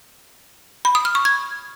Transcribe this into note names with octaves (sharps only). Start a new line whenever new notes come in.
B5
D#6
F6
C#6
G#6